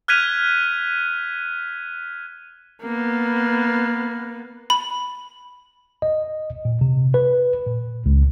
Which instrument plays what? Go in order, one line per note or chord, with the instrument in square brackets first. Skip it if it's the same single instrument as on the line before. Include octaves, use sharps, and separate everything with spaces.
[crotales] F6 F#6 G#6 B6 D#7 F7
[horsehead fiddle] A#3 B3
[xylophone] B5
[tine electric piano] D#5
A#2
C3
B4
A#2
C#2